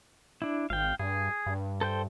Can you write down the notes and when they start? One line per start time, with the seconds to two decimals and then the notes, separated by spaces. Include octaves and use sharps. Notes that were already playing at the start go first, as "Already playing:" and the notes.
0.42 D4 E4
0.70 G#1 F5 G5
0.99 G2 G#4
1.46 G2
1.81 A4 C5 G5